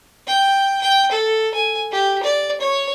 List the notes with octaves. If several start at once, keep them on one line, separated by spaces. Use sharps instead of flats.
G5
G5
A4
G#5
G4
D5
C#5